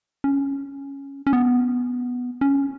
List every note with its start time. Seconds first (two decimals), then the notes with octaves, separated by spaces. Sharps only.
0.24 C#4
1.27 C#4
1.33 B3
2.41 C#4